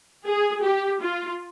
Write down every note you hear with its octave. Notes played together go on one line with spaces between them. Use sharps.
G#4
G4
F4